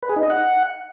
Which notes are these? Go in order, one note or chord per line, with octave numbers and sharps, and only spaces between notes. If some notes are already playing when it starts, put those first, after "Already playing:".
B4
G#4
D#4
D#5
F#5